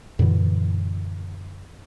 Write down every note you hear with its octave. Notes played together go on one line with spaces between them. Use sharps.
F#2 A#2 D3 E3